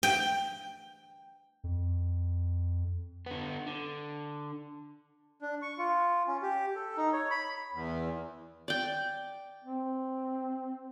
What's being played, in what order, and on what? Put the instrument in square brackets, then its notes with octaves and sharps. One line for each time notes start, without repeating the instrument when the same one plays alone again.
[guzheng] G5
[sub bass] F2
[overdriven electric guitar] D3 B3
D3
[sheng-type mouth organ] D4
C#6
F4
C#4
G4
A4
D#4
C#5
B5
[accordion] E2
[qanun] D5 G5
[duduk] C4